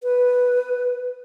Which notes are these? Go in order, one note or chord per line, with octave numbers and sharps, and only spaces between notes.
B4